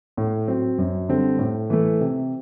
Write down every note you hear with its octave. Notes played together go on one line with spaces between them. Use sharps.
A2
F#3 C4
F#2
D3 G3 C4
A2
E3 A3
C3